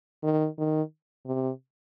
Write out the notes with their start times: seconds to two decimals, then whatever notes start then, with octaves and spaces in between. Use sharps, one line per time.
0.23 D#3
0.58 D#3
1.26 C3